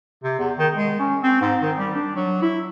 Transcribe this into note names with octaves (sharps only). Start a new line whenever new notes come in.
C3
E2
D#3
G#3
C#4
C4
G#2
D#3
G3
D4
F#3
E4